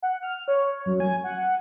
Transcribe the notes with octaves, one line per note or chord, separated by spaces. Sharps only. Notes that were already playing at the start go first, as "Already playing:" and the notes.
F#5
F6
C#5
F#2
G#5
F#5